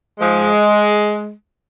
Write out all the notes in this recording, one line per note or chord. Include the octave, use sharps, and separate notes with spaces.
G#2 F3 G#3